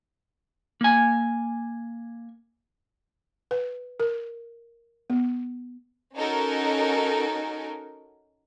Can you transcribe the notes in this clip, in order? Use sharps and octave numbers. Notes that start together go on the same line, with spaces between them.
A#3 G#5
B4
A#4
B3
C#4 D#4 F#4 A4 A#4